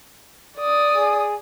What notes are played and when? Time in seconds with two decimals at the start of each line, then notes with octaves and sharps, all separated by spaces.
0.58 D5 D#6
0.97 G#4